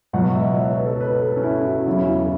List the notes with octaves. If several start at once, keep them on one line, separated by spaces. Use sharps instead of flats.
C#2 B2 F#3 F#5
E5
C#5
B4
A4
B4
A4
C#4
E4
F#4
E2 C#3 F#3 E4
C#4
E4
A4